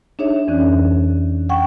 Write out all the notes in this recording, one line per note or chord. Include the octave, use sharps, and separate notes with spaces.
D4 D#4 G#4 C#5 E5
F2 E3 C#4 D5 F#6
F#5 G5 C#6